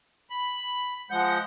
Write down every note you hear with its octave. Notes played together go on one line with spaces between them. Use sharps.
B5
F3 G#3 F#5 G6